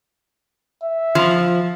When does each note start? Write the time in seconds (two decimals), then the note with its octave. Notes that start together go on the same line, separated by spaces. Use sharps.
0.84 E5
1.15 F3